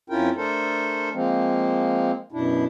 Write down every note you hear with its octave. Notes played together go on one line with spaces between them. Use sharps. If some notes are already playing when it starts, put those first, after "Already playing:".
F2 C#4 E4 F4 A#4 G5
A3 D4 A4 A#4 C5
F3 G#3 A#3 C4
F#2 B2 D4 E4